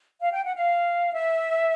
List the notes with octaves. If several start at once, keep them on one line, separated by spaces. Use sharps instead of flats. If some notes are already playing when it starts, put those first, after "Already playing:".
F5
G5
F#5
F5
E5